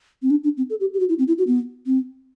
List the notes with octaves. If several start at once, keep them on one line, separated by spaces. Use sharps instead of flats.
C4
D4
D4
C4
A4
G4
G4
F#4
E4
C4
E4
F#4
B3
C4